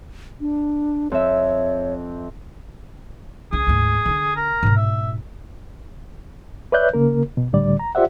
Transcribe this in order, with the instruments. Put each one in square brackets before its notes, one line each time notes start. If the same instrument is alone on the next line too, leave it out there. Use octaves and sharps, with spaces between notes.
[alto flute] D4
[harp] F2 E5 [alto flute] C#5
[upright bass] C#2 C#4 [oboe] G#4
[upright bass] D2 G#2
D3 D4
[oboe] A#4
[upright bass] G#2 B2
[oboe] E5
[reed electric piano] B4 C#5 D5 E5 F#6 G6
C#3 A#3 A#4
B2
C#2 A2 D3 G3 D5
A#5
F4 G4 C5 D5 E5 F#5